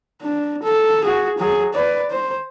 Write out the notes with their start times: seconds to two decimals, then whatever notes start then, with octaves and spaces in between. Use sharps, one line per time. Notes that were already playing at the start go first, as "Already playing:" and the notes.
0.22 D4
0.63 A4
1.05 F#4 G#4
1.39 F#3 G#4
1.74 B4 D5
2.11 C5